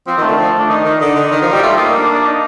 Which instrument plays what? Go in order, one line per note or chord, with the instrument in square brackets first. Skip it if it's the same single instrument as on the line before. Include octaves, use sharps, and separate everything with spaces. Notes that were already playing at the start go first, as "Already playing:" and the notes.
[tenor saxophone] F3 [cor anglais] C4
[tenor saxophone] D#3
[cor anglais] A3
[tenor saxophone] D3
F3
[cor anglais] D4
[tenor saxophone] D#3 [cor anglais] D#4
[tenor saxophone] D#3
[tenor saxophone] D3 [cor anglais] D#4
[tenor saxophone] D3
D#3
F3
G3
[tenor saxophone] A3 [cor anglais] F4
[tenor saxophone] A#3 [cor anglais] D#4
[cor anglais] D4
D4
D#4